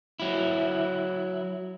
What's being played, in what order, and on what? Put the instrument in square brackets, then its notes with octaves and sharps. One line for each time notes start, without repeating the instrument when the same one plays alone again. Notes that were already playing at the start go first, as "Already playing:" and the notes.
[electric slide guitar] F#3 E4